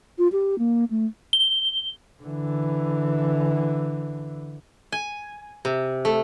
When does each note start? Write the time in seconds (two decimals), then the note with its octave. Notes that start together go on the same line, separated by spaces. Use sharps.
0.18 F4
0.32 G4
0.59 A#3
0.90 A3
1.33 G7
2.23 D3 E3
4.92 G#5
5.65 C3
6.05 A3